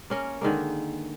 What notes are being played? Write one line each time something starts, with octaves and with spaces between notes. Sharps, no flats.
A#3 C#4 A#4
D3 D#3 G#3 A#3